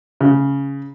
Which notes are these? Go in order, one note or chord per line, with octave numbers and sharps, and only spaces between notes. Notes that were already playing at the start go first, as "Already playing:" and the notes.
C#3